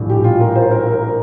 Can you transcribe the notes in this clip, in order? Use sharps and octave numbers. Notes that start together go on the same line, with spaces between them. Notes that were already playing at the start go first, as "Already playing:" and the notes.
Already playing: A#1 A2 G3 D4
G4
F4
A#4
C5
A#4
A#4